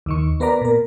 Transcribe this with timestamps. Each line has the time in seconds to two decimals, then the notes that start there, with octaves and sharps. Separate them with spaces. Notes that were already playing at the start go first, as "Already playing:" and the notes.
0.06 D#2 D#3 C#6
0.40 B3 A#4 B4 D5 A#5
0.61 A#2 A#4